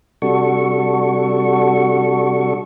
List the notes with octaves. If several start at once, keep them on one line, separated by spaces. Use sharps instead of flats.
C3 G3 D4 F#4 A4 C#6